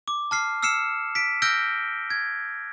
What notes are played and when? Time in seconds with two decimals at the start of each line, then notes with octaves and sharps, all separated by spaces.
0.08 D6
0.31 A5 F6 C7
0.63 E6 F6 C7 C#7 E7
1.15 B6 D7
1.42 E6 F6 G6 A#6 D7 G7
2.10 G#6